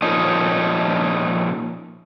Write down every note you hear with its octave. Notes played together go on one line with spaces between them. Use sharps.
A#2 F3 C#4 D#4